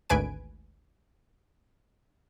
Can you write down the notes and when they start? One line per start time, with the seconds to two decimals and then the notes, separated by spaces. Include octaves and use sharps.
0.10 G#1 D2 B4 G#5 D7